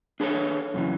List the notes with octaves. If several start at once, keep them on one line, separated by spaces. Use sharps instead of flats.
D4 G#4 A4 B4 C#5
F#2 C#3 E3